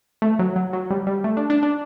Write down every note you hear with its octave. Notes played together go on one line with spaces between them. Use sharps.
A3
F#3
F#3
F#3
G3
G3
A3
D4
D4
D4